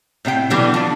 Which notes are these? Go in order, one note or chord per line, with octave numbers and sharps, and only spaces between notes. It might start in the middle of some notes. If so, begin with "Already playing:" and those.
A2 C3 D4 G5
B2 D3 E3 F#3 G3
F3 D4